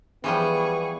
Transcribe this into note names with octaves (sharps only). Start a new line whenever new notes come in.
E3 F3 G3 B3 G#4 C#6